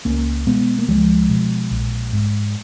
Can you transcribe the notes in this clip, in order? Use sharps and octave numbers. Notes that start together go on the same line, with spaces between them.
C#2 A#3 C#4
B2 G#3 B3
A#3
C#2 F3 G#3
B2
A#1
G#2